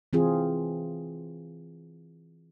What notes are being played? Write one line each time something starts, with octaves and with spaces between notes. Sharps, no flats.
E3 C4 F4 G#4